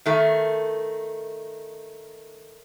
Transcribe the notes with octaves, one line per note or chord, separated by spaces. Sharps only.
D#3 A3